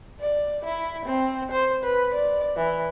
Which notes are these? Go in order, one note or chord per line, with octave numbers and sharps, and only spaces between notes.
D5
E4
C4
C5
B4
D5
E3